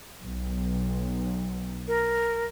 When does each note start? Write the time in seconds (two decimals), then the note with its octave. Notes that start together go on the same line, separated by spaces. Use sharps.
0.24 B1
1.88 A#4